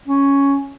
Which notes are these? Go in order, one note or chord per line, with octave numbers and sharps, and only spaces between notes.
C#4